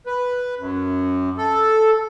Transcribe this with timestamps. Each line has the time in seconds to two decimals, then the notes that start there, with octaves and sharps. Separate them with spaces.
0.06 B4
0.59 F#2
1.37 A4